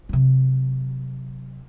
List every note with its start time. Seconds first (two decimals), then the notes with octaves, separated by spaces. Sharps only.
0.09 C3 F#3